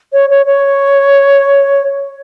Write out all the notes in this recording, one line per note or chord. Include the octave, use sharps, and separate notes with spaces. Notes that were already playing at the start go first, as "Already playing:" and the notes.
C#5
C#5
C#5